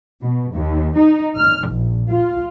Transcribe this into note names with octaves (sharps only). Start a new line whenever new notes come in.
B2
D#2
D#4
F6
A#1
F4